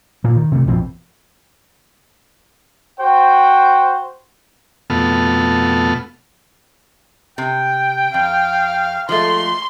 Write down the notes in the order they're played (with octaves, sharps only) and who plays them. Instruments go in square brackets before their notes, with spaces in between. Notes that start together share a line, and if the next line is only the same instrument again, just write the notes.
[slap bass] A#2 A#3
D#3
C3 A3
A#1 F2 B2 C4
[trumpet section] F#4 C5 G5
[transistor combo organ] F2 B2 A3 B3 A4 F6
[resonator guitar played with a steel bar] C3 [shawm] G5
[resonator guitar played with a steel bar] F2 [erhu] F5
[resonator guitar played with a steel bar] F3 G#3 A3 [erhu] C6